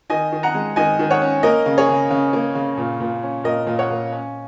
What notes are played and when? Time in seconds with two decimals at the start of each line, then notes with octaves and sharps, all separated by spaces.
0.10 D#3 D#5 G#5
0.32 D#3
0.43 F#5 A#5
0.54 G#3
0.76 D#3 D#5 G#5
0.99 D#3
1.10 C#5 F#5
1.21 C#4
1.43 A#3 A#4 D#5
1.66 C#3
1.78 G#4 C#5
1.89 C#3
2.10 C#3
2.33 A#3
2.55 C#3
2.77 A#2
3.00 A#2
3.23 C#4
3.44 A#2 A#4 D#5
3.67 A#2
3.79 C#5 F#5
3.90 A#2
4.12 C#4